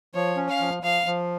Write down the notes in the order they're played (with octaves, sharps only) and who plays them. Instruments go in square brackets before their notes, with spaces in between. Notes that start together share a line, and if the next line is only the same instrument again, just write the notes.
[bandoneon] F3 [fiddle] C#5
[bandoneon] C#4
[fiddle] F5
[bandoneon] F3
[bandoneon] F3 [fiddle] F5
[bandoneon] F3